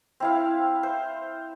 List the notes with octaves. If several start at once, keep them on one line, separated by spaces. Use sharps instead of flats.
C4 E4 F5
C5